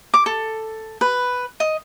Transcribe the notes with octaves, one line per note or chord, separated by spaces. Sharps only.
D6
A4
B4
D#5